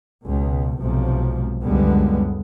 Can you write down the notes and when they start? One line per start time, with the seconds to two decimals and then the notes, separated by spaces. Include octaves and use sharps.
0.23 C#2 B2
0.80 B1 G#2 C3 F3
1.64 C#2 F#2 D3 G3 G#3 B3